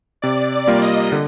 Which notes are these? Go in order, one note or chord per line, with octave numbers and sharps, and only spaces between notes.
C3 D5
D5
G3 A#3 F4 A#4
D#5
D3